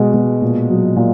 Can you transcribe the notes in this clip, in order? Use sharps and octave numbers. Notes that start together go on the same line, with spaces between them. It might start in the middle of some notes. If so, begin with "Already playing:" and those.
Already playing: B2 G#3 D#5
B2
A#2
F#3
A#2